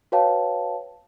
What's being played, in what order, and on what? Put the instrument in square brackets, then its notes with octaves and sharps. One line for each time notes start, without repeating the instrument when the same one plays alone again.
[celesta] F#4 B4 C#5 F5 G5 A5